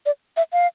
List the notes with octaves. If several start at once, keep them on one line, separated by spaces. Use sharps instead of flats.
D5
E5
F5